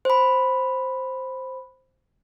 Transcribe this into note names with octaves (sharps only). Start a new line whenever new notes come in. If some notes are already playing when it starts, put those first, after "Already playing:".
C5 B5